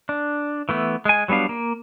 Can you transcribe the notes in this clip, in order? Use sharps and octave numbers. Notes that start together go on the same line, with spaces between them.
D4
E3 A3 B3
G#3 G#5
F#3 G3 B3 D4 F5
A#3